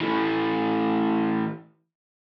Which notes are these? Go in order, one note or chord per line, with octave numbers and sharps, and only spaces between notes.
E3 A3